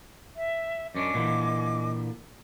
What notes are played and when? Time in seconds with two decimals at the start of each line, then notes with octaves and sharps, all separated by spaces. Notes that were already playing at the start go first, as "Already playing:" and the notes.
0.36 E5
0.95 F#2 C#4 D4 D#5 G#5 D6
1.14 A#2 D3 E3